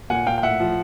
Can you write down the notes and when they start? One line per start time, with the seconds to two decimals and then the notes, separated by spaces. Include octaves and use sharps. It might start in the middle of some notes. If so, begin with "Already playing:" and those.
0.10 A#2 F#5 G#5
0.27 A#2 F5 G5
0.38 G5
0.43 A2 E5 F#5
0.60 F3